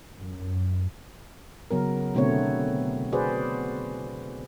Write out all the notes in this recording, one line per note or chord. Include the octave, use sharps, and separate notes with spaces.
F#2
C#3 F#3 B3 A#4
B2 D3 A3 B3 C4 C#5
F#4 G#4 B4 C5 D5